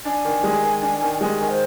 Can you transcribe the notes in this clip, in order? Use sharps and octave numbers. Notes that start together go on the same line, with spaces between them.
D4 G#5
D#3
G#3
D#3
D4
D#3
G#3 G#5
D#3
C5